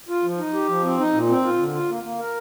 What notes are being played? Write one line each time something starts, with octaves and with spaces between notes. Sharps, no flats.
F4
F3
D#4
G4
F3
C4
D#4
A#2
C4
F4
D3
F4
A#3
A#3
A#4